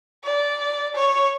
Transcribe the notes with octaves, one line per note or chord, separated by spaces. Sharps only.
D5
C#5